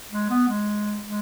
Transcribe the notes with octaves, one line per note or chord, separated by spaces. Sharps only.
G#3
B3
G#3
G#3